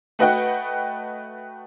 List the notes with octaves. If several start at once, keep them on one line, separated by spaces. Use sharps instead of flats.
A3 F#4 B4 D#5 F#5 G5